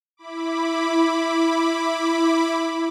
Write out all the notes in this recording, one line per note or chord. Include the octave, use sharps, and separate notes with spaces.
E4 B5 D6